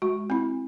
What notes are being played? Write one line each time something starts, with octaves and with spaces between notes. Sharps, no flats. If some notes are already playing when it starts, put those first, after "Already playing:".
G#3 F#4
C4 E4